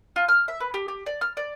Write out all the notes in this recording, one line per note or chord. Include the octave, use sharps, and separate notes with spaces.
F4
F6
E5
B4
G4
G4
D5
F6
D5